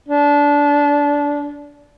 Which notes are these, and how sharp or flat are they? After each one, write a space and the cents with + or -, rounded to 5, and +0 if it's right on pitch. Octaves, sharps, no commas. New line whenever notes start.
D4 -20